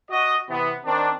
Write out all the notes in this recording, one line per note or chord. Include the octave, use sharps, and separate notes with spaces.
F#4 D#5
C3 E3 B3
D#3 C4 D4